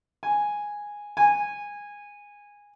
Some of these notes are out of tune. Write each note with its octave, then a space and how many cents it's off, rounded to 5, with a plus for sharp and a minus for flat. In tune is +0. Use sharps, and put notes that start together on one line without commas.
G#5 -5
G#5 -15